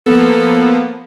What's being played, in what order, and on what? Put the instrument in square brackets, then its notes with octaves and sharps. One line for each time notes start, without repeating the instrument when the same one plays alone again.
[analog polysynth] F3 A#3 B3 [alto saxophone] A4